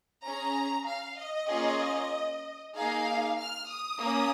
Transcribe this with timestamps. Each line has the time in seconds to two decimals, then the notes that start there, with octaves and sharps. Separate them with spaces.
0.24 C#4 G#4 A#5
0.86 F5
1.18 D#5
1.49 A#3 C#4 F4 G#4
2.75 A#3 D#4 G#4 F5
3.38 F6
3.69 D#6
4.01 A#3 C#4